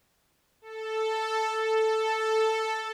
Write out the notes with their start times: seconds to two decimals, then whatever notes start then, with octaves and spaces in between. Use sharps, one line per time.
0.61 A4
1.65 A4